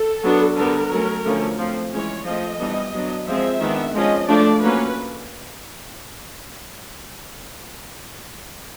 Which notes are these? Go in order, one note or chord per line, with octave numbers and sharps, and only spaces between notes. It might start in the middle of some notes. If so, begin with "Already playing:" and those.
Already playing: A4
F#3 B3 D4
D3 G3 B3 A#4
F#3 A3 C#4
D3 F3 A3 C#4
F3 A3 C4
E3 G#3 C#4 C#5
F3 A3 C4 D#5
E3 G3 B3 D4
F#3 B3 D4
F3 G#3 C4 E5
D#3 G#3 B3 D4
F3 G#3 C#4 D#5
F3 A3 D4 D5
F#3 A#3 C#4 B4